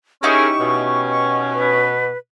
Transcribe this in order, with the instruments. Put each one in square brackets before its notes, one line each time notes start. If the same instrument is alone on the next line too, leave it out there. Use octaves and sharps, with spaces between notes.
[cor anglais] C#4 [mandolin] D#4 E4 G4 [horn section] G#4 A#4 [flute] C#6
[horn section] B2 [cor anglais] C#4
[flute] C#6
B4